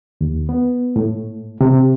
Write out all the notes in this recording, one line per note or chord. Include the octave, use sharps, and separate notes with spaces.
D#2
B3
A2
C3